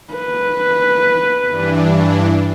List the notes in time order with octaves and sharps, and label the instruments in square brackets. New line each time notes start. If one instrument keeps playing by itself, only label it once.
[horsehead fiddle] B4
[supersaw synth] G2 E3 D4